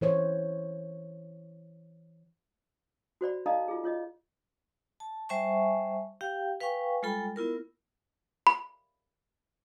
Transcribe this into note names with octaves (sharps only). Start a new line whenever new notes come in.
E3 C5 C#5
F#4 C5 D5 B5
D#4 A4 D5 D#5 F5 A#5
F4 G#4
F4 C#5 D#5
A5
G3 C5 E5 G#5 A5 C#6
G4 F5 G5
B4 F5 G5 G#5 C#6
G3 G#3 F4 A4 G5 B5
B3 E4 F4 A#4
B5